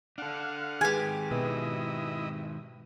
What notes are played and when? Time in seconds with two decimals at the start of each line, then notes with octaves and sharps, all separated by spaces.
0.18 D4 A4 F5 F#5
0.81 D#3 G#3 G4 G#4 B4 G#5
1.31 B2 B3 E4 B4 D#5